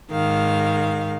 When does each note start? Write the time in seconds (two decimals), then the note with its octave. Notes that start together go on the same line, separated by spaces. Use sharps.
0.11 G#2 D#3 F5